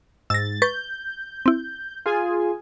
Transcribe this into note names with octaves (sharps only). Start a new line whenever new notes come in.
G#2 E6 A6 A#6
B4 C#6 G6 A6
C4 E4
F4 G#4 G#5